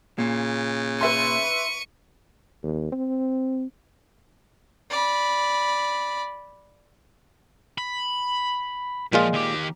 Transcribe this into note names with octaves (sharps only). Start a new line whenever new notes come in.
A#2 C#3
B4 E5 C6 C#6 D#7
D#2
C4
D5 B5
B5
A#2 F3 G#3 F4
D#2 G4